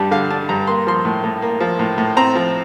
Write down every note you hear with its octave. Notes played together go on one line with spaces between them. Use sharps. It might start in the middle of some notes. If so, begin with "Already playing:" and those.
Already playing: G2 G3 D4 A5
D3 F5
D4 A5
G2 A#5
A#3 C6
F3 C6
A2
A2
A#3
F3
A2
A2
C4 A#5
F3